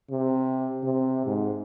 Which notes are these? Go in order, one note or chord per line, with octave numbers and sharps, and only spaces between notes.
C3
C3
G#2